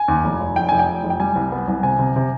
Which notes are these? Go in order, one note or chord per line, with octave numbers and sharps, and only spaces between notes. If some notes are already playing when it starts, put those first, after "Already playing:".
Already playing: G#5
D#2
F1
F1
F1 G5
F1 G#5
G5
F1
F1
G5
G3 G#5
C2
B3
C2
C3 G#5
C3
C3